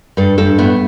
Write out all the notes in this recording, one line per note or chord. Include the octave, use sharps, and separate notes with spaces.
G2 A4
G2 A4
A2 B3